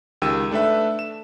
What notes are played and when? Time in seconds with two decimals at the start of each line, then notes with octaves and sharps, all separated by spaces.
0.22 C#2 D#3 G4 E6 D#7
0.51 A3 D4 A4 B4 E5
0.99 E7